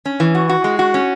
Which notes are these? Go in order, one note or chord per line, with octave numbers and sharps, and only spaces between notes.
C#4
E3
F#4
F#4
G#3
F#4
C#4